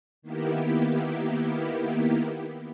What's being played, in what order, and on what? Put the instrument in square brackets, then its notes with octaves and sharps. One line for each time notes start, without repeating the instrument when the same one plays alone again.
[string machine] D#3 A#3 B3 E4 G4